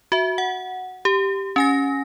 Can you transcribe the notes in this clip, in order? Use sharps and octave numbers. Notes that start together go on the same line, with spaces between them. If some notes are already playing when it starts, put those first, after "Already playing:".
F#4 E5
F#5
G4
C#4 G#5 A#6